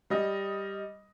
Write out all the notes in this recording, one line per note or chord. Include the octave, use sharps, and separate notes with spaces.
G3 D#5